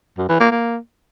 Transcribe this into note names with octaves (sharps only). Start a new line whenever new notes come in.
F#2
E3
A#3
A#3